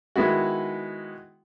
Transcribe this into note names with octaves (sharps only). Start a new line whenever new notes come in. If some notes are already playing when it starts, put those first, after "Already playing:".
D#3 G#3 B3 E4 F#4